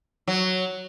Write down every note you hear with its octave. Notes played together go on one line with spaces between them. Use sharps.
F#3